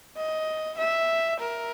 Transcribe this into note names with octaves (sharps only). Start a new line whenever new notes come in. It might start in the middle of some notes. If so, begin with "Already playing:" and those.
D#5
E5
A#4